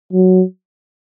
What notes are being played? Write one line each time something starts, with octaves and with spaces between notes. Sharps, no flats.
F#3